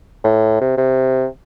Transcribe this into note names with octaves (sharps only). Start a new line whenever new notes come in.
A2
C3
C3